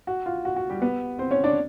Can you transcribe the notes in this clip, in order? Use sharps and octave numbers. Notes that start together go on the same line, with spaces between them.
F#4
F4
F#4
F#4
G3 G4
B3 B4
C4 C5
C#4 C#5
D4 D5